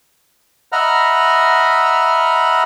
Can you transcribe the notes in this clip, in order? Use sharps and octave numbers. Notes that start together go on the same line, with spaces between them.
D#5 E5 F#5 A#5 B5 F6